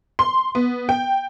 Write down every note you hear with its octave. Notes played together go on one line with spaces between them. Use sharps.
C6
B3
G5